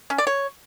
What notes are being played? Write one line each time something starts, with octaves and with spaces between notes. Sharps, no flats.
C#4
D5
C#5